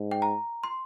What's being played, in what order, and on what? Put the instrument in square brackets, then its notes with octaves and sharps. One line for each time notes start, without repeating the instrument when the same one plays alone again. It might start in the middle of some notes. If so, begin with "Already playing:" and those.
Already playing: [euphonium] G#2
[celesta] G5
A#5
C6